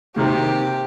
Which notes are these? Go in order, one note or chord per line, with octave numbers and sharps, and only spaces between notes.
C3 D#3 A#3 G4